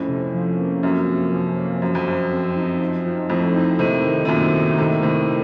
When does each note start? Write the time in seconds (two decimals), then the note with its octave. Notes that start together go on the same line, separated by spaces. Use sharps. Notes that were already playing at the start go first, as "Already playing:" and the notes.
Already playing: F2 A2 C#4
0.08 C3
0.34 F3
0.58 A#3
0.82 F#2 C#4
1.07 C3
1.32 F3
1.57 A#3
1.81 F#2 F3
1.95 F2
2.07 F#2 F3
2.32 C4
2.56 D#4
2.81 F3
3.05 F3
3.30 F2 A2 C4
3.55 D#4
3.79 A2 C3 D#3
4.05 D#3
4.25 C3
4.28 F#2 A#2 A3
4.54 D#4
4.78 A2 C3 D#3
5.03 A2 C3 D#3
5.28 A3